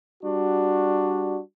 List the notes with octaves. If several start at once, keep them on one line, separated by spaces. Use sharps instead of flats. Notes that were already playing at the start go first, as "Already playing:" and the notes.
G3 D4 F#4